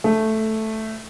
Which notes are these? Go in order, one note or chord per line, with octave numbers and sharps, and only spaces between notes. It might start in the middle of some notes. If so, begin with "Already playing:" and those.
A3